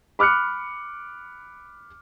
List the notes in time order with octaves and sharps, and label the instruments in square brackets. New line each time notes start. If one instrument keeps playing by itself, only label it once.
[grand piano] B5 D6 F6 F#6 C#7